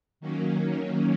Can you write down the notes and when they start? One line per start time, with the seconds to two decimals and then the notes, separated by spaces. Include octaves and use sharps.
0.20 D#3 F#3 A#3 C#4